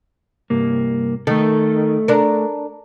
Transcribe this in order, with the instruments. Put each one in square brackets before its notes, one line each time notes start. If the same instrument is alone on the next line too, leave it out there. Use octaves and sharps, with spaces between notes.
[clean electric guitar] C2 G2 A#3
[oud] D#3 [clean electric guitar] A3 A4
[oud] D4 A#4